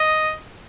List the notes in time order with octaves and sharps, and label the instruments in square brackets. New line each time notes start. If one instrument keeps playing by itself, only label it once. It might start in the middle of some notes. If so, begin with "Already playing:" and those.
Already playing: [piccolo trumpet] D#5